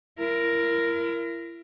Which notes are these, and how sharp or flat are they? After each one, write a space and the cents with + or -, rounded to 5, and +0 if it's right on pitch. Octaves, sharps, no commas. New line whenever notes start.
E4 +40 A#4 +0